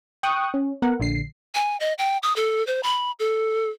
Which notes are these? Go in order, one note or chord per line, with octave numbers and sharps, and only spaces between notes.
G5 C#6 D#6 F#6
C#4
B3 A#4 F#5
A#1 D3 C7
G#5
D#5
G5
D#6
A4
C5
B5
A4